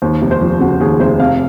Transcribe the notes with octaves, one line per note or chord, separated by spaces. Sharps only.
D#2 C5
F1
C5
F3
C#3 F#4
D#2 G#4
F1 C5
C3 F5